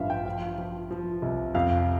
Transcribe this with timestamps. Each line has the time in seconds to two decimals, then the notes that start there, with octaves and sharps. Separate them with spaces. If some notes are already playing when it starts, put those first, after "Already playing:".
Already playing: A1 G2 F3 E5 F5
0.10 G5
0.25 F3 F5
0.58 F3
0.91 F3
1.22 C2
1.55 F2 F5